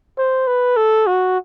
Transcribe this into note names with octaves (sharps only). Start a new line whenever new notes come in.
C5
B4
A4
F#4